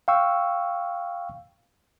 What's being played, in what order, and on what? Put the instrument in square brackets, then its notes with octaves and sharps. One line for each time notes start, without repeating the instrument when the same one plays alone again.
[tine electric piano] F5 G5 C#6 E6